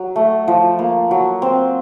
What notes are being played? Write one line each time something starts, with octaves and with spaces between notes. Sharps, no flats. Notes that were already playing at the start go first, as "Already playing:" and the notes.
Already playing: F#3
A3
F3
A#3
F#3
C4